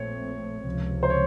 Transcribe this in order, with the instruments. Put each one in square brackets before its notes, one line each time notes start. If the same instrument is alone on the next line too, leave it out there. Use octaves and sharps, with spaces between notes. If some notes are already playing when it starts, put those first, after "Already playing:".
Already playing: [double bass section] A#1 A#2 A3 C4 [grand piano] C#5
[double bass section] C#2 C3 F3
[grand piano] C5
C#5